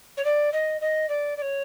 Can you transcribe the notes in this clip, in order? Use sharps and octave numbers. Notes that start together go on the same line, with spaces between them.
C#5
D5
D#5
D#5
D5
D5
C#5